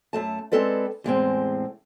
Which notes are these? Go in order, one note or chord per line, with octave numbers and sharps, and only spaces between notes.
F#2 A3 A5
G#3 C4 A4 B4 D5
E2 A2 G#3 C4